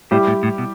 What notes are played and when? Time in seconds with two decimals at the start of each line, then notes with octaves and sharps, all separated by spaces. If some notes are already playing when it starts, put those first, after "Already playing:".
0.11 A2 G3 E4 G4
0.27 A2
0.43 A2
0.58 B2